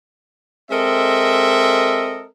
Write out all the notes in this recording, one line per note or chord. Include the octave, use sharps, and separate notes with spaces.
G#3 C4 A4 A#4 D#5 E5